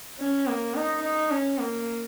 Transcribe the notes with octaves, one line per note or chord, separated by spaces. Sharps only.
C#4
A#3
D#4
D#4
C#4
A#3